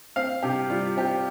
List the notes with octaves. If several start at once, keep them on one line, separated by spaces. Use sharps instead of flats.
C4 F5
C3 G4
G3 F4
C4 G4